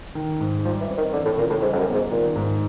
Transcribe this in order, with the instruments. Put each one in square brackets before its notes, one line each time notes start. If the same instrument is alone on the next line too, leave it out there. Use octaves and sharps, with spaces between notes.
[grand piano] D#3
G#2
[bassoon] F3 [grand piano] G3
[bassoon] E3
[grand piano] C4
[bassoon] D#3
[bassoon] D3 [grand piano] E3
[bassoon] A2
[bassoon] A#2 [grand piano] C#3
[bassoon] A2
[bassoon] G#2 [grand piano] G3
[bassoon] F2
F#2
[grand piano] B3
[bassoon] G#2
[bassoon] A#2 [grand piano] D#3
[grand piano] G#2